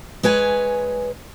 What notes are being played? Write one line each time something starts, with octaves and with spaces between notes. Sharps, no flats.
G#3 B4 C#5 G#5